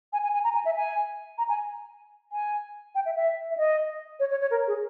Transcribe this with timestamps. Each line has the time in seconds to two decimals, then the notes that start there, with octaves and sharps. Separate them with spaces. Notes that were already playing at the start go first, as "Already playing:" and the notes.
0.13 G#5
0.23 G#5
0.34 G#5
0.44 A#5
0.54 G#5
0.65 E5
0.76 G#5
1.38 A#5
1.49 G#5
2.32 G#5
2.95 G5
3.06 E5
3.16 E5
3.51 E5
3.57 D#5
4.20 C#5
4.31 C#5
4.41 C#5
4.51 A#4
4.67 G#4